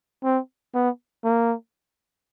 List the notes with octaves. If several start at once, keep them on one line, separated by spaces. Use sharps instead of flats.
C4
B3
A#3